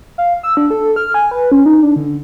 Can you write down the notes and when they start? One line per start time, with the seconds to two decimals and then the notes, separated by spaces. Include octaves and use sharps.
0.18 F5
0.43 E6
0.57 D4
0.70 A4
0.96 F6
1.14 G#5
1.31 B4
1.52 C#4
1.66 D#4
1.83 D4
1.96 D3